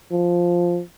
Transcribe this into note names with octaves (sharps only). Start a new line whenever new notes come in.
F3